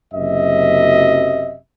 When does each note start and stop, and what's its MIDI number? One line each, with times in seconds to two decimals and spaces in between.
0.14 1.58 30
0.14 1.58 42
0.14 1.58 48
0.14 1.58 75
0.14 1.58 76